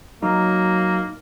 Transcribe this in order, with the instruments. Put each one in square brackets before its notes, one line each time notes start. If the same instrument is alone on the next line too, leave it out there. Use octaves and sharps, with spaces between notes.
[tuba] F#3 [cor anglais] A#3 [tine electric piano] D#4